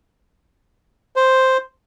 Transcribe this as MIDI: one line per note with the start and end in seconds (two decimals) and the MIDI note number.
1.16 1.57 72